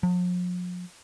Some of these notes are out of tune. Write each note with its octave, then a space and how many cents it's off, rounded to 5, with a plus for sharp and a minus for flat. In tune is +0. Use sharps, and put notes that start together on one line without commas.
F3 +45